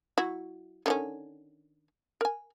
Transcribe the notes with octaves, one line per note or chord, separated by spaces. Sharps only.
F#3 E4 F#4
D3 D#3 C#4
A#4 G#5